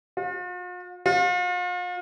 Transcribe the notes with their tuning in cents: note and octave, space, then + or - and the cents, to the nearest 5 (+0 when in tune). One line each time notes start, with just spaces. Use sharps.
F4 +45
F4 +40